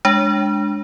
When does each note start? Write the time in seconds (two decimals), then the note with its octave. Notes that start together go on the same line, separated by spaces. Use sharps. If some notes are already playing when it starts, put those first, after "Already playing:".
0.05 G#3 D4